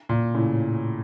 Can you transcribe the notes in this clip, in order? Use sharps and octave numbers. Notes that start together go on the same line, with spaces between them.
A#2
A2 C#3